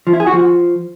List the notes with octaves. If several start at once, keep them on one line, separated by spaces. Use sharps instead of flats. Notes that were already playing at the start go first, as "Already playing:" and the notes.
F3
E4
G#4
F#4
F3